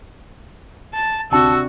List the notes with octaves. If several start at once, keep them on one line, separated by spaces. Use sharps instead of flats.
A5
D2 C3 D4 F#4 A5 E6